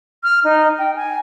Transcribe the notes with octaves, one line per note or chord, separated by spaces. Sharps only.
F6
D#4
G5
G#5